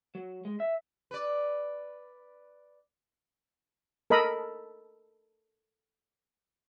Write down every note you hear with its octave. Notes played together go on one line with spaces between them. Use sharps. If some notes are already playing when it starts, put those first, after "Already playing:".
F#3
G#3
E5
B4 D5
A4 A#4 D#5 B5